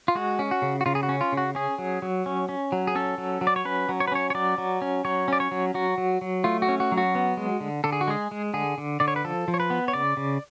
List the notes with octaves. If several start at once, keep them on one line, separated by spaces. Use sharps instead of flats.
F4
G#3 F#4
C#4
F#4
C#3
F#4
C#3 F4
G#4
F#4
C#4
F4
C#3
F#4
C#4 G#4
F#3
F#3
C#4
C#4
F#3
G#4
C#4 A4
F#3
F#3
D5
C#5
C#4 B4
F#3
C#5
B4
C#4 C#5
C#5
F#3 D5
F#3
C#4
F#3 C#5
C#4 D5
C#5
F#3
F#3 F#4
F#3
F#3
A3 F4
F#4
C#4
F#4
F#3
F#4
B3
G#3
D3
D3 A4
G#4
F#4
G#3 G#4
G#3
D3 G#4
D3
D3 D5
C#5
B4
F3 A4
F3
C#5
B4
B3
C#5
C#3 D5
C#3